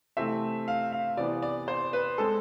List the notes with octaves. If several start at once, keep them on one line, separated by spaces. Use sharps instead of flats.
C3 E3 A3 C4 E5
F5
F5
C3 E3 B3 D5
D5
C5
B4
G#3 C4 A4